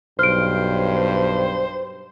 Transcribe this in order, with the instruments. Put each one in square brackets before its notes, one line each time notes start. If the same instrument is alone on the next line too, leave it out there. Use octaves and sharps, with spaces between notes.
[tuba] B1 [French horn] G2 [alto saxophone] C5 [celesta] F6 D7